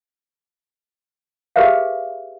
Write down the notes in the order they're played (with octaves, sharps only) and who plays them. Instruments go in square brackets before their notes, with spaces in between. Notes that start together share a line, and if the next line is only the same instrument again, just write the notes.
[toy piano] G4 G#4 A#4 B4 E5 F5